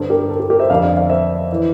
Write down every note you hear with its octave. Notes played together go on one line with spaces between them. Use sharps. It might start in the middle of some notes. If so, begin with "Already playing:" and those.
Already playing: G2 D3 A4 C5
G4 A#4
A4
G4
G4 A#4
C5 E5
F2 D3 D5 F5
D5 F5
D5 F5
C5 E5
E3